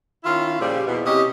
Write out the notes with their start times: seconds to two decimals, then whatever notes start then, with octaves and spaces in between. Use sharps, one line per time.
0.24 D#3 C#4 E4 F4
0.59 A#2 C#3 F3 G3
0.86 E2 B2
1.05 C3 C#4 E4 G4 D#5